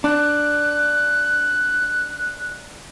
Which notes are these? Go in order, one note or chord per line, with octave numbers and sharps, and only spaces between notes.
D4 F#6